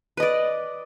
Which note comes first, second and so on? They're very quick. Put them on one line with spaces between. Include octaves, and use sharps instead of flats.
B4 D#5 D5